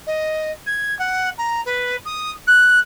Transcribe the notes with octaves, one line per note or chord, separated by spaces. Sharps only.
D#5
G#6
F#5
A#5
B4
D#6
F#6